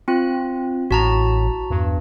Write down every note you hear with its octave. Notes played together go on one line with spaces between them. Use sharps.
C4 F4 F#6
A1 A2 F#4 A5 A#5
E2 G2